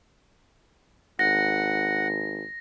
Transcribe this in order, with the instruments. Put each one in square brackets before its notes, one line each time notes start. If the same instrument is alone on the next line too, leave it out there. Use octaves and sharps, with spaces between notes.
[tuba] G#1 [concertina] F#5 [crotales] A#6